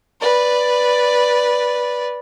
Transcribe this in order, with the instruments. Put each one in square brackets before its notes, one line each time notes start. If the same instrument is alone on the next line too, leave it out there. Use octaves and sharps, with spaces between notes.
[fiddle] B4 D5